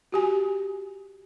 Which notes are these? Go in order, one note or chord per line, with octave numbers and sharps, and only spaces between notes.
F#4 G4 G#5